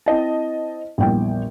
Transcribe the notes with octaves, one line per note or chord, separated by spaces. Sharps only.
C4 E4 D#5 A5
A#1 E2 G3 G5